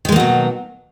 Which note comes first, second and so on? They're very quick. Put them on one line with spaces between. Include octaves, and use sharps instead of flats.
D#3 G#3 A#3 F#3 B2